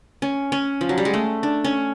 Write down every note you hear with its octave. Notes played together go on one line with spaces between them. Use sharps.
C#4
C#4
F3
F#3
G3
G#3
A3
D4
C#4